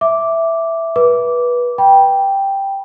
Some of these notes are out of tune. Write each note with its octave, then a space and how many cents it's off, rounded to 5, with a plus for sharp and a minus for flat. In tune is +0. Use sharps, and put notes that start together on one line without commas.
E5 +0 D6 -5
B4 -20 D6 -15
G5 +0 B5 -30